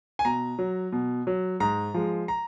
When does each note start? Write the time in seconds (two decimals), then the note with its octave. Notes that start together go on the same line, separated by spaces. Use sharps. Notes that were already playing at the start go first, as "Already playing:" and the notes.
0.19 G#5
0.25 B2 A#5
0.59 F#3
0.92 B2
1.27 F#3
1.60 G#2 A#5
1.94 F3 G#3
2.28 A#5